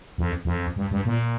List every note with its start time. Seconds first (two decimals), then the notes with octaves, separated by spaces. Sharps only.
0.18 F2
0.45 F2
0.76 G2
0.91 G2
1.05 A#2